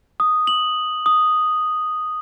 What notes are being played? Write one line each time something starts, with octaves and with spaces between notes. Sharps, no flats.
D#6
F#7
D#6